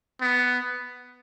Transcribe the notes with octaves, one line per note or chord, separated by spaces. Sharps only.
B3